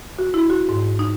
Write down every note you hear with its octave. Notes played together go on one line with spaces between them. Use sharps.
F#4
E4
F#4
G#2
D#4